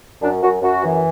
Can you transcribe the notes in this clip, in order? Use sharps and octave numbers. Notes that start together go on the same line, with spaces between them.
F#2 D4
F#2 F#4
F#2 F#4
E3